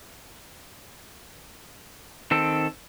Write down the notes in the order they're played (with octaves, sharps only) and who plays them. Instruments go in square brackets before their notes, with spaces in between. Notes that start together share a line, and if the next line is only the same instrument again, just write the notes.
[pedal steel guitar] D#3 C4 A4